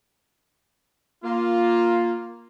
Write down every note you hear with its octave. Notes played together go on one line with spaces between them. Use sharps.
A#3 F4